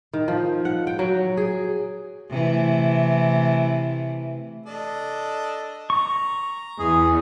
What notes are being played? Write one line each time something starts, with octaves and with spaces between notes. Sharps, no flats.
D#3
F3
F#5
G5
F#3
G#4
C3 E3 A3
D4 A4 D#5
A#5 C#6
E2 G#4